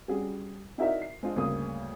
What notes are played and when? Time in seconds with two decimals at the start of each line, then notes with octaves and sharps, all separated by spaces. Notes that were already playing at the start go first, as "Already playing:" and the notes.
0.08 G3 C#4 F#4 G#4
0.78 D#4 E4 F#4 A#4 D5 E5
1.02 C7
1.23 G#3 C4 D4 F4 G#4
1.36 D2 G2 C#3 A#3 D#6